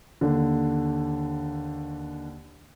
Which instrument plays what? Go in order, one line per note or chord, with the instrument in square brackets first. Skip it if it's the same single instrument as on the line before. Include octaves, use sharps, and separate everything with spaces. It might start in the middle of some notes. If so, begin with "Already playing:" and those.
[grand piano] D#2 D3